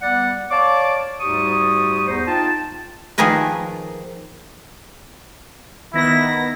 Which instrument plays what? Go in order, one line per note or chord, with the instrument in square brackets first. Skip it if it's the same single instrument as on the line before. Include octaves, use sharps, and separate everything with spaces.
[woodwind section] G3 B3 D5 F#5
C#5 D5 F5 A5 D6
D2 G#2 G3 G4 C#6 D#6
E2 D#4 C5
D#4 F4 G5 A5
[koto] D#3 F3 A#3 G#4 A#4 B4
[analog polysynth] D#3 B3 A#6 [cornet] E4